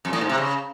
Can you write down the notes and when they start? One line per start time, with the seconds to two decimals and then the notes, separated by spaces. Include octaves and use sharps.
0.05 F2
0.13 A2
0.21 G#2
0.29 C3
0.38 C#3